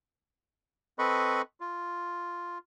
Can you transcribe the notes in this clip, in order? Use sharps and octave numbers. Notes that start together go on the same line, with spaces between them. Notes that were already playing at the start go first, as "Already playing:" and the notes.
C4 A4 B4 D#5 B5 C#6
F4